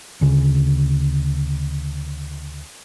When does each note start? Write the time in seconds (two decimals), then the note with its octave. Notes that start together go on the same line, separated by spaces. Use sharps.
0.21 D2 C#3